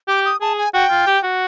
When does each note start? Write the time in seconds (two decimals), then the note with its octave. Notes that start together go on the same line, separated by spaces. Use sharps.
0.08 G4 D6
0.25 D#6
0.41 G#4 A5
0.57 G#5
0.74 F#4 G5
0.90 F4
1.07 G4
1.24 F#4